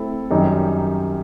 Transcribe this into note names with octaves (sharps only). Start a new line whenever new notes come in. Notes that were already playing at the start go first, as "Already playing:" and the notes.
Already playing: A3 C4 E4 A4
F#2 D#3 G3 D#4 G4